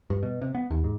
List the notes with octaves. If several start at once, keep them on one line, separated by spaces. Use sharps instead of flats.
G2
B2
C3
B3
D#2
G#2